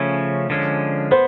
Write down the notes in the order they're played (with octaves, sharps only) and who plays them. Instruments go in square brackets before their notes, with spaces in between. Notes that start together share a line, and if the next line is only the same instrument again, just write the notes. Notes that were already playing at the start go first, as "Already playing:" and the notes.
Already playing: [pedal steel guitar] C#3 F3 A3 C#4
D3 F3 G#3 C#4
[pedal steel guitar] B3 [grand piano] C5